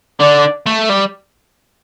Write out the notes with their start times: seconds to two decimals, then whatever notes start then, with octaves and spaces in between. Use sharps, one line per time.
0.20 D3 D5
0.66 A3
0.89 G3